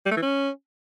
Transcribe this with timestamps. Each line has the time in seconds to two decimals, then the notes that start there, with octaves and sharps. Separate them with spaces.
0.06 G3
0.11 A3
0.17 E3
0.22 C#4